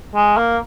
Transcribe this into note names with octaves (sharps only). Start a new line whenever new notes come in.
G#3
A#3